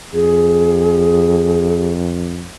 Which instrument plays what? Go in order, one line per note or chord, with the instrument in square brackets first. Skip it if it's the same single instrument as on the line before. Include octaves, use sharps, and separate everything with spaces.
[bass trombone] F2 [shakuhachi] G#4